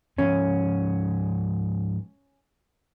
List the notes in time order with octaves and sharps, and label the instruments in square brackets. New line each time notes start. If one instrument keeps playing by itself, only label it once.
[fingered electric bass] G#2 F3 [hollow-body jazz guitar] C#4